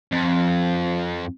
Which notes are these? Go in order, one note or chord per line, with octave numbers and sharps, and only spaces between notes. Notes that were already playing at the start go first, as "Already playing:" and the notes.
F2